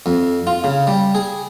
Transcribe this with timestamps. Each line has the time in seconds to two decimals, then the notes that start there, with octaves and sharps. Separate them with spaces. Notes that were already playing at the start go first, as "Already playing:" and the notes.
0.06 F2
0.47 F4
0.64 C#3
0.87 G3
1.15 G#4